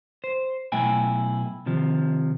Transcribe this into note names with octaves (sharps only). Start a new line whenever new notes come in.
C5
B1 A3 E4 G5 G#5
C3 D#3 F3